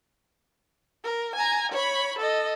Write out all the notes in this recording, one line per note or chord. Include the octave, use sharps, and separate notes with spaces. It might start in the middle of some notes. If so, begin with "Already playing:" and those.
A#4
G#5 A#5
C#5 B5
A4 D#5